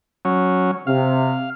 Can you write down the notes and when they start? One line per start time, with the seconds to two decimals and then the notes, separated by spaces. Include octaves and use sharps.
0.25 F#3 C#4
0.87 C3 F5